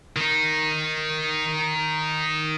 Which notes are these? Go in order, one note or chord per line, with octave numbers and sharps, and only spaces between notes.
D#3 D#4